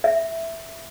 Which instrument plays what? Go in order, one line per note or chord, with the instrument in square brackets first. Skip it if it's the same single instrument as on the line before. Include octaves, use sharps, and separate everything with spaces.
[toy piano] E5